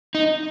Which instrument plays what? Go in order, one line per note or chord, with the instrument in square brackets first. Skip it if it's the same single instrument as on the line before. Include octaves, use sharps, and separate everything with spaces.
[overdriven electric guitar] D#4